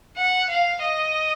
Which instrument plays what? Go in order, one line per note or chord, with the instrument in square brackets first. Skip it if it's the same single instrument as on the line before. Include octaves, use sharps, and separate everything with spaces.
[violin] F#5
F5
D#5